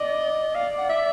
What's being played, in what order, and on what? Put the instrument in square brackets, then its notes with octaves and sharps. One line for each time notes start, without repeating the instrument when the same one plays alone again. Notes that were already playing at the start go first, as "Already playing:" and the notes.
Already playing: [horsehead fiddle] D5 [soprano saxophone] D#5
[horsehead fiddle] D5 [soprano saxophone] F5
[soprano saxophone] F#5
E5